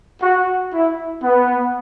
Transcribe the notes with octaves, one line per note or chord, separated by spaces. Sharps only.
F#4
E4
B3